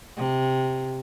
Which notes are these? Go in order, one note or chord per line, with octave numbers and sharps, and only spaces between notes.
C3